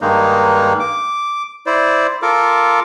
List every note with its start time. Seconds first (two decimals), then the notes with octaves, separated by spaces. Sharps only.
0.01 G2 D#3 G#3 A#3 D#4
0.80 D6
1.66 E4 C5 D5
2.22 F4 A4 A#4 D6